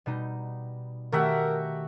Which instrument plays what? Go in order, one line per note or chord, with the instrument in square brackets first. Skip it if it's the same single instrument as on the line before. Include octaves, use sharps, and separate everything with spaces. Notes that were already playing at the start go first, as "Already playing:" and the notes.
[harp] B2 G3 D#4
[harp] D#3 A3 A#5 [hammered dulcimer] F#4 G4 E5 [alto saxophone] A#4